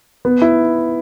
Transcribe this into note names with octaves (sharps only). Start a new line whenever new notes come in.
B3
E4